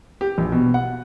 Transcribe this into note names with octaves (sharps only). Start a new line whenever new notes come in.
G4
A#1
B2
F#5